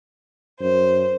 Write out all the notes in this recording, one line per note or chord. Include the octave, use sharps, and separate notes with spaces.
F#2 C5